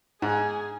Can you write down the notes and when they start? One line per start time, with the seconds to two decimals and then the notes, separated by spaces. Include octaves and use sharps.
0.22 G#2 G#4